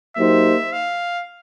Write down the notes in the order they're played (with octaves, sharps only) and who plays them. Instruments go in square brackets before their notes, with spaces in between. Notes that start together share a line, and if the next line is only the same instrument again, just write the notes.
[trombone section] F#3 A#3 D#4 G4 C5 [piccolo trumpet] E5
[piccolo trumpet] F5